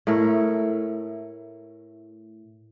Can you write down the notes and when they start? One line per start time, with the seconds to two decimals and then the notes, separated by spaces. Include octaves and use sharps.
0.07 A2 A3 E4 A#4